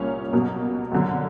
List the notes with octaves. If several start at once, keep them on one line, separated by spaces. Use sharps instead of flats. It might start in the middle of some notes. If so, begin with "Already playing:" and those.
Already playing: C2 A#2 A#3 C#4
B2 F#3 A#3
F#2 D3 F#3